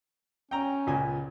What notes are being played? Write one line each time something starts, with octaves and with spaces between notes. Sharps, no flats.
C#4 G5 A#5
C#2 A#2 G#5